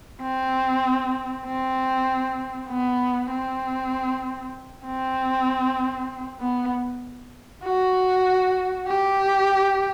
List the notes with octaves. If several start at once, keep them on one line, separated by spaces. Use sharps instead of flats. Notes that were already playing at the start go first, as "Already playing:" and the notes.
C4
C4
B3
C4
C4
B3
F#4
G4